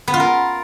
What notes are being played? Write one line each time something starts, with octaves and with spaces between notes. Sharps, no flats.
B3
F4
A#4